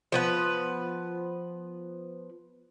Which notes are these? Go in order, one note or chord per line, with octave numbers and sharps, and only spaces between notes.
F3 B3 B4